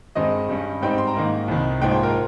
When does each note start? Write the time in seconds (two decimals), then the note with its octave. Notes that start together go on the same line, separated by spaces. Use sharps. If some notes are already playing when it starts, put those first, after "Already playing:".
0.15 G2 D#3 G#3 C4 D#4 D#5
0.49 G2 G3 C#4
0.82 G#2 G3 C4 D#4 G5
0.98 C6
1.07 A#5
1.15 G#2 D#3 A#3 D#4
1.48 C2 C3 D#3
1.81 A#1 G#2 F3 G5
1.91 C5
2.03 A#4